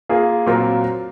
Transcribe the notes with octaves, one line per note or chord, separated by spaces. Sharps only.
A#3 F4 G#4
A#2 F#3 C4 F4 A#4